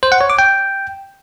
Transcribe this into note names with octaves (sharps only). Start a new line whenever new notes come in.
C5
F#5
C#5
D6
G5